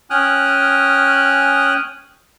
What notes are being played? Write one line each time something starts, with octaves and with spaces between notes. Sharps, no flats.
C#4 G5 G#5 D#6 F6 F#6